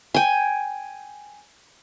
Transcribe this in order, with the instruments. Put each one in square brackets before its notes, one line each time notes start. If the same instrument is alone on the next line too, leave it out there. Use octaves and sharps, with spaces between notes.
[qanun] G5 G#5